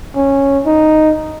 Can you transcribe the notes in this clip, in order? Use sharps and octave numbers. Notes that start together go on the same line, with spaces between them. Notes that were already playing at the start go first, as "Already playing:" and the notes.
C#4
D#4